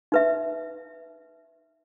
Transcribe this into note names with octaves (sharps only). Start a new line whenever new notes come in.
D#4 B4 E5